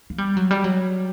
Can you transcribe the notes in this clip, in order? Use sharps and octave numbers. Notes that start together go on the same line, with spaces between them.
A#3
G3
F#3
G3
F#3